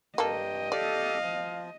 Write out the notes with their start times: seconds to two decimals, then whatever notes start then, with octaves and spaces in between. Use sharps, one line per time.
0.18 G2 A#3 A4 D#5 G5
0.72 G4 A4 D5 F5
1.22 F3